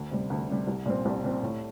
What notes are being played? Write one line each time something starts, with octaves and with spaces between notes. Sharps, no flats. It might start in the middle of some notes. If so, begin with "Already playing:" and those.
Already playing: D2
C3 G3
D2
C3 G3
C2
A#2 G3 C4
C2
A#2 G3 C4
A2